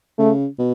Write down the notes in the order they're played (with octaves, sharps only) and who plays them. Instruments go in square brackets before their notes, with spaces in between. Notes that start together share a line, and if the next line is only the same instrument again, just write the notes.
[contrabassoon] C#3 [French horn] A3
[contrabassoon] B2